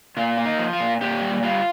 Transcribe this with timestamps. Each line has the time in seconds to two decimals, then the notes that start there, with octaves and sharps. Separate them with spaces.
0.17 A#2 F4
0.38 A#3
0.45 D#4
0.58 F3
0.73 F4
0.81 A#2
1.01 A#2 G4
1.22 G3
1.43 G3 F4